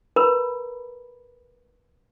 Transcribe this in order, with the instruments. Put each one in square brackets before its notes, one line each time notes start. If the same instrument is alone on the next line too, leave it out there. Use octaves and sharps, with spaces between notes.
[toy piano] A#4 B4 A#5 B5